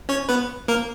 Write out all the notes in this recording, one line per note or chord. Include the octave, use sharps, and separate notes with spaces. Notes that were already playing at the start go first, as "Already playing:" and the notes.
C#4 C#5
B3 B4
A#3 A#4